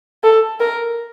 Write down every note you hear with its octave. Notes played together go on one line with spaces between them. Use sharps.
A4
A#4